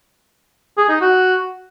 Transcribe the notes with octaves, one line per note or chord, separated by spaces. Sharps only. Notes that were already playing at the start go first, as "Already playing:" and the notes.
G#4
D#4
F#4